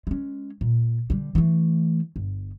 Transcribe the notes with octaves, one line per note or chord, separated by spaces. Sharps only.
G#3 C#4
A#2
D3 G3
E3 A3
G1